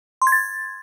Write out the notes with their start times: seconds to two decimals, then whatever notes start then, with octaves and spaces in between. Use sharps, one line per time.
0.22 C6
0.27 G#6
0.32 A6